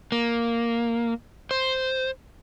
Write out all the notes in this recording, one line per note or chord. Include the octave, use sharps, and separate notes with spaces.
A#3
C5